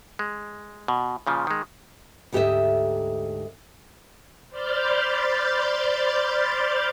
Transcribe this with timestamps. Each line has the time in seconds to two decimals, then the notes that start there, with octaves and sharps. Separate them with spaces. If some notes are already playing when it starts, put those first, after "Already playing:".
0.19 G#3
0.88 B2
1.27 A#2 C#3 F3
1.47 D#3 G#3
2.33 D2 G#2 G4 A4 D#5 E5
4.50 C5 D5 B5 F6 G6 A6